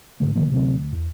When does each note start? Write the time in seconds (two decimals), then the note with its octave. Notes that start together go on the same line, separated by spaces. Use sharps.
0.20 G#1 F2 D3 A3
0.35 D3 D#3 F3 A#3
0.50 D2 C3 F#3 C4
0.75 D2
0.93 E2